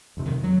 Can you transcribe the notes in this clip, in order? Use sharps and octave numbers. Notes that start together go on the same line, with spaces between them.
F2 C3
D#3
F#3